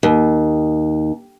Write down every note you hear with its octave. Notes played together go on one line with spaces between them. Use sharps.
D#2